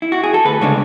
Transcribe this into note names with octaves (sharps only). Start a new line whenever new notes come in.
E4
F#4
G#4
A4
D2 B4
C#3 G#3 D4 C#5